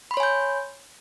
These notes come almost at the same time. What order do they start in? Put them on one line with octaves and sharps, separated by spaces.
B5 C6 C#5 G#5 G6